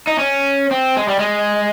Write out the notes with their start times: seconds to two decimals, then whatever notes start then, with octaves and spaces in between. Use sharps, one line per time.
0.07 D#4
0.19 C#4
0.71 C4
0.97 G#3
1.08 G3
1.19 G#3